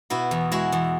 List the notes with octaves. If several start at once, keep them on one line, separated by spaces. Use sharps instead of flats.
B2 E4 F#4
E2
G#3 E4 F#4
E2